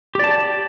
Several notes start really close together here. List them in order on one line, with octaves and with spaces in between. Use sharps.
G4 D5 A5